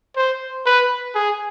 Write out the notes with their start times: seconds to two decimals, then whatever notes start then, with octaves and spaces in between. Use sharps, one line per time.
0.16 C5
0.66 B4
1.15 G#4